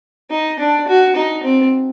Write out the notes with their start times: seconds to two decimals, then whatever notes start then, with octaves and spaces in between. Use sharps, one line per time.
0.31 D#4
0.59 D4
0.87 F#4
1.16 D#4
1.44 C4